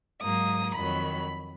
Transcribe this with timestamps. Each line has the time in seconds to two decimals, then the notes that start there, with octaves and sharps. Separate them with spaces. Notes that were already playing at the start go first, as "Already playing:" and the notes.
0.22 G#2 F#3 A#3 D#6
0.75 F2 D#3 F#3 B5